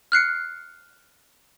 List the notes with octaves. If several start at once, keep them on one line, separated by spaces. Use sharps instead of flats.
F6 F#6 C7 C#7